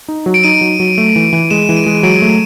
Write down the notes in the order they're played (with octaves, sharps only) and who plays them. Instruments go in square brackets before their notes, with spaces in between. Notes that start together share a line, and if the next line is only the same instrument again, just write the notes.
[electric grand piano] D#4
F#3
[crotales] D7
[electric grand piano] D#4 [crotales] D#7
[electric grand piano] F#3
F#3
A3
E3
E3
[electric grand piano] G#3 [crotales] E7
[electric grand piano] E3
[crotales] D#7
[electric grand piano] G#3
[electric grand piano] F#3 [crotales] D7
[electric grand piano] A3